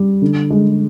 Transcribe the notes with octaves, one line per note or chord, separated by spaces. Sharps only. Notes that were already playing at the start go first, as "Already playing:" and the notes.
Already playing: G3
D3
G#3